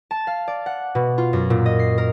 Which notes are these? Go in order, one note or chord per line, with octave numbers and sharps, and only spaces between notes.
A5
F5
D5
F#5
B2
F4
F#2
A#2
D#5
C7
A#4